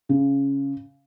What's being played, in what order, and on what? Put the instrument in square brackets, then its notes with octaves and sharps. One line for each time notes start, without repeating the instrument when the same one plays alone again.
[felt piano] C#3